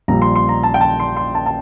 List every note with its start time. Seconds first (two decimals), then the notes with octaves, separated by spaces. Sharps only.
0.08 A#1 A#2 G3 A#5
0.22 C6
0.35 C6
0.49 A#5
0.63 A5
0.74 G5
0.81 A5
1.00 C6
1.17 C6
1.35 A5
1.46 A5